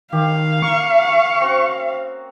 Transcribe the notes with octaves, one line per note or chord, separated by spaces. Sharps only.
D#3 G4 F5
A#3 C#6
C4 C#4 F#4